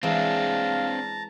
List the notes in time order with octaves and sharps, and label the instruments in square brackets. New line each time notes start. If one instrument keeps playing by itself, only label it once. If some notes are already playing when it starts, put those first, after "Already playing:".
[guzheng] E3 G#3 [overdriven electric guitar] C4 D4 [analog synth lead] F5 [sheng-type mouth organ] A5 A#5